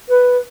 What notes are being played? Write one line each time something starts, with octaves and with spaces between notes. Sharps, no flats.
B4